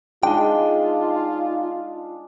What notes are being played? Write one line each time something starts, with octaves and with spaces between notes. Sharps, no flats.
G#3 D4 D#4 F4 G5